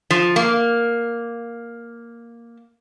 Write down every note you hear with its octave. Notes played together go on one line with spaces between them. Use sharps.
F3
A#3